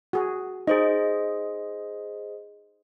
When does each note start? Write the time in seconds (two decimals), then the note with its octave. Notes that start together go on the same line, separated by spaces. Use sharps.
0.13 F#4 G#4
0.67 D#4 G#4 C5 D#5